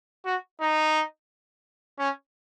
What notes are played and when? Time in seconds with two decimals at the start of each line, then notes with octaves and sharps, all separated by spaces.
0.25 F#4
0.61 D#4
1.99 C#4